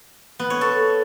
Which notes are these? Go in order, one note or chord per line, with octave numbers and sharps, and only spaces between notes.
B3
C#5
A4